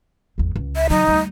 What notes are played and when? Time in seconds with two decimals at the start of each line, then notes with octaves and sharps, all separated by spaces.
0.38 G#1 E2
0.56 C#2
0.76 E5
0.90 C#3 F#3 D#4
1.08 D2 G3